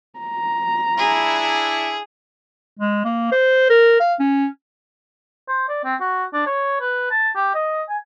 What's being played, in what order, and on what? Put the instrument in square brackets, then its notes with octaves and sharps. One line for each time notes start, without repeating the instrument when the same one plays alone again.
[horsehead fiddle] A#5
[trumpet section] D4 E4 [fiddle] G#4
[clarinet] G#3
A#3
C5
A#4
F5
C#4
[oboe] C5
D5
C4
F#4
D4
C#5
B4
A5
G4
D#5
G#5